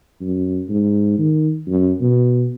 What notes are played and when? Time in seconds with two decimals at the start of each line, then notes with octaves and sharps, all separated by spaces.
0.21 F#2
0.69 G#2
1.18 D#3
1.67 F#2
2.01 B2